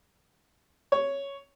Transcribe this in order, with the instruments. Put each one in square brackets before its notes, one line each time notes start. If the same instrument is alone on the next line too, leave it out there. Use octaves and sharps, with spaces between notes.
[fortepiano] C#5